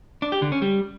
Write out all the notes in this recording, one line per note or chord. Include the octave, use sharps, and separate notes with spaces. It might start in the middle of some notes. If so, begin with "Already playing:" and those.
D4
G4
D3
C#4
G3